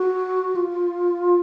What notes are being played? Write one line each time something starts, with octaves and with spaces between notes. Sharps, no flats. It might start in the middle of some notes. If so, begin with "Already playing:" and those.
Already playing: F#4
F4